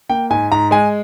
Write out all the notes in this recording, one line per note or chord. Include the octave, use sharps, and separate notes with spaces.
A#3 G5
G#2 G#5
G#2 A#5
G#3 G#5